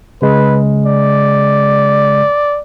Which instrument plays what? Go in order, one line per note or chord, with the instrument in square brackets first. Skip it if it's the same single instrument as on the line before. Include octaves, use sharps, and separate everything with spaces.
[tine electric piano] C#3 G#3 [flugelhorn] B4
[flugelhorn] D5